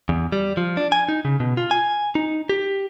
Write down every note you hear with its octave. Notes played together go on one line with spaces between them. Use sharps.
E2
G3
F3
D4
G#5
D#4
C#3
B2
F4
G#5
D#4
G4